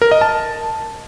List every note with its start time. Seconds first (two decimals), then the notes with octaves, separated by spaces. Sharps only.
0.02 A#4
0.11 D#5
0.21 A5